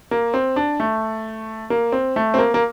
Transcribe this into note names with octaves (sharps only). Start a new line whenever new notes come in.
A#3
C4
D4
A3
A#3
C4
A3
C4
A#3
A#3